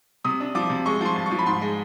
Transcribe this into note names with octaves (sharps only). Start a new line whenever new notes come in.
C3 D#6
D4
F3 D6
C3
G#3 C#6
F3 C6
G2
C#6
F3
B5
G#2 C6
G#3